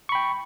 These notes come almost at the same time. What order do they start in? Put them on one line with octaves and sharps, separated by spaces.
C#6 B5 G5